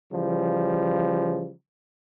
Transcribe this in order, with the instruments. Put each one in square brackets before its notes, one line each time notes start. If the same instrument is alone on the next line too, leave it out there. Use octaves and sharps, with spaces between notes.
[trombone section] C#3 E3 F3 G3